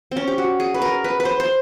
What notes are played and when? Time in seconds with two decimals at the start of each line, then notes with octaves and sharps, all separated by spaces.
0.11 C4
0.17 C#4
0.27 G4
0.38 F#4
0.60 G#4
0.74 B4
0.82 A#4
1.04 B4
1.20 B4
1.25 C5
1.40 C5